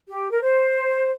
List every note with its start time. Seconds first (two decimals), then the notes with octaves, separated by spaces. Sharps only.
0.09 G4
0.30 A#4
0.41 C5